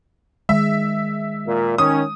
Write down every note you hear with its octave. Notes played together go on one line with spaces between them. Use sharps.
D#3 G#3 E5
A#2
D#3 C#4 D#6